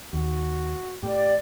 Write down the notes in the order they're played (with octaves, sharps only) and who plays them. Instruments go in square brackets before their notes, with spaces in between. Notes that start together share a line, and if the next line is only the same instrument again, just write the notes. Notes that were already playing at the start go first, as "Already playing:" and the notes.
[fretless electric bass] D#2 [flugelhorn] F#4
[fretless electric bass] A2 [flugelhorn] G4 [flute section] D5